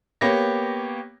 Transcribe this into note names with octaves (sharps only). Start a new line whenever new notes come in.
A#3 B3 G4 C#5 A#6